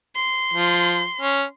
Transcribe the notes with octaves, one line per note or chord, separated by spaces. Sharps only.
C6
F3
C#4